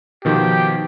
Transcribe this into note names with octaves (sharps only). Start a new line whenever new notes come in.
B2 D#3 F3 G4